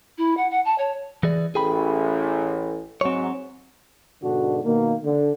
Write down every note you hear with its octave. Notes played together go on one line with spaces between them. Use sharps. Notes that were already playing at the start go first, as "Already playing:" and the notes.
E4
F#5
F#5
A5
C#5
E3 G#4 D5
A1 G#4 G5 B5
G#2 F#3 C4 C#5
G#2 B2 D3 D4 F#4
B2 D#3 A#3
D3